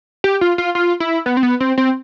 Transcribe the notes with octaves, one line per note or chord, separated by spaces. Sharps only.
G4
F4
F4
F4
E4
B3
C4
B3
C4
C4